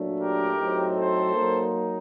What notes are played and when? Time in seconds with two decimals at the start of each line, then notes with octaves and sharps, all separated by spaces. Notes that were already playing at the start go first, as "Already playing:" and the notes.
Already playing: A#2 F#3 A3 D4
0.20 G4 A#4
0.58 A2 F#3 C4 D#4
0.96 A4 C5
1.33 F#3 A#3 D#4